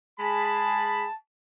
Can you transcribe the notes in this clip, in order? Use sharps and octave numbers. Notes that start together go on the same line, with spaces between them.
G#3 G#4 A5 B5